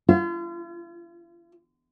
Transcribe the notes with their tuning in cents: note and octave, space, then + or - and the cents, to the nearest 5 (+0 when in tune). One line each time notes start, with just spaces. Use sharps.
F4 -40